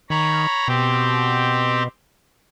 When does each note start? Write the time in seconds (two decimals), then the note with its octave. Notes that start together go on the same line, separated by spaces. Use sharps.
0.10 D#3 C#5 A#5 B5
0.68 B2 C4 G4